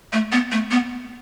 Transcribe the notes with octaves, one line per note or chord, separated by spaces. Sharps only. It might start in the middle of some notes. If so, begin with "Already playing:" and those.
A3
B3
A3
B3